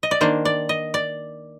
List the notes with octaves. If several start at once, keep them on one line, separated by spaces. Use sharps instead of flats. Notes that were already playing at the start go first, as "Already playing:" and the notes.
D#5
D5
D#3 A#3 D4 C5
D5
D#5
D5